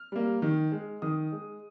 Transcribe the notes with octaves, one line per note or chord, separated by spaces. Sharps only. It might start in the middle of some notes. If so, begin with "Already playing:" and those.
Already playing: F6
G3 A#3
D#3
G#3
D#3 D#6
G#3